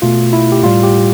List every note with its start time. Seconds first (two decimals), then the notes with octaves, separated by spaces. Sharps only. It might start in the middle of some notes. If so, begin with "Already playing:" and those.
0.02 B2 A3 F4
0.33 E4
0.52 G4
0.63 A2 G3 F4
0.83 G4